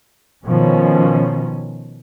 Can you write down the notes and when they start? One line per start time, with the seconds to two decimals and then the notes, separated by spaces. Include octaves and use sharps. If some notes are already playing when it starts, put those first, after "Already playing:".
0.46 B2 D#3 F3 C#4